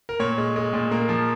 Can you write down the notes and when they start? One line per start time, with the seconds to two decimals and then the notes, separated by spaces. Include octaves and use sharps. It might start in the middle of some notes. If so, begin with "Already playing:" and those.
0.09 A#4
0.20 A#2 C#5
0.38 G#3
0.56 G#3
0.73 A#2
0.91 A#3
1.09 F3